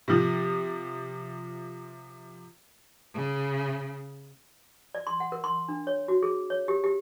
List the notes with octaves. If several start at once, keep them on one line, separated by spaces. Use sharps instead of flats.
C3 F3
C#3
D5
C6
F#5
A#4
C6
D4
C#5
F#4
G#4
C#5
G4
G4